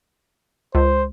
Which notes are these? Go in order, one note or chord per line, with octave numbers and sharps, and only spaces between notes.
C#2 C5